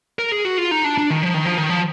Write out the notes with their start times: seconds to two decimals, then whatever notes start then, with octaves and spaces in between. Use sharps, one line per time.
0.19 A#4
0.32 G#4
0.45 F#4
0.58 F4
0.71 D#4
0.84 D4
0.98 D4
1.10 D#3
1.23 F3
1.34 D#3
1.46 F3
1.57 D#3
1.69 F3